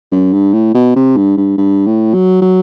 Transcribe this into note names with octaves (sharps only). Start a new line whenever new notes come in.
F#2
G2
A2
B2
C3
G2
G2
G2
A2
F#3
F#3